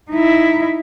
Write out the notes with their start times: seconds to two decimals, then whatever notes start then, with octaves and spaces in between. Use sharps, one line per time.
0.10 D#4 E4